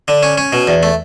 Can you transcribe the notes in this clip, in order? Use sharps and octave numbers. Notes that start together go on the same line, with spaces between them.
D3
C#4
C#4
B2
E2
A3